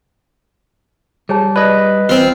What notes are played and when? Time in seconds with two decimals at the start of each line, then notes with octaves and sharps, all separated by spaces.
1.29 G3 G#4 C#5 A5
1.56 B4 D5 D#5
2.09 E2 C4 F4